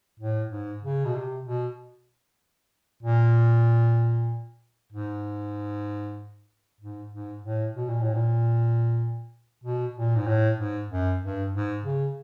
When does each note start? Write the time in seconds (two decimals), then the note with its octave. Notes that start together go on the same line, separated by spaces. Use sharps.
0.20 A2
0.51 G#2
0.83 C#3
1.06 B2
1.14 C3
1.45 B2
3.03 A#2
4.93 G#2
6.81 G#2
7.12 G#2
7.44 A2
7.75 B2
7.89 A#2
8.02 A2
8.15 A#2
9.64 B2
9.96 A#2
10.16 G#2
10.27 A2
10.58 G#2
10.91 F#2
11.22 G2
11.54 G#2
11.84 C#3